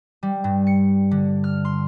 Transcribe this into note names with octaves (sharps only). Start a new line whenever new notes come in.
G3
G2
C#7
D3
F6
C6